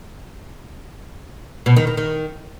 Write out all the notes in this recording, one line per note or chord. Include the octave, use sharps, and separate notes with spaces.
B2
D#3
D#3
D#3